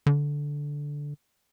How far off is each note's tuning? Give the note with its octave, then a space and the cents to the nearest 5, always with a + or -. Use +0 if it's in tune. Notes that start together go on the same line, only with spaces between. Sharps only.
D3 -10